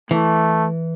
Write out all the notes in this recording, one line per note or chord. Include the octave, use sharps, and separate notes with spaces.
E3 A3